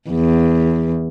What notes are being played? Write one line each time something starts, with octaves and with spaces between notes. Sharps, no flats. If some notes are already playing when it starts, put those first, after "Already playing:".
E2